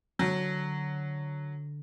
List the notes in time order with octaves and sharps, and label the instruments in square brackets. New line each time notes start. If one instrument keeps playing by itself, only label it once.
[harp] D3 [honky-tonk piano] F#3